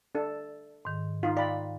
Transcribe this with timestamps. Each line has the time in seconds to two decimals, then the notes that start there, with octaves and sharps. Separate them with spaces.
0.15 D4 A4
0.85 G#2 D#3
1.23 D#4 F4
1.37 D5 F5 G5 B5